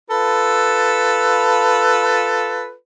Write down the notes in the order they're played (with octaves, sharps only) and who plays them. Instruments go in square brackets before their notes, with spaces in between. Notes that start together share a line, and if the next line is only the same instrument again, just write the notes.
[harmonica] F4 A4 B4